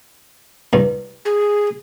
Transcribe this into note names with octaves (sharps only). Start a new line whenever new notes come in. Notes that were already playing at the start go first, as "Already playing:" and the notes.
C2 G2
G#4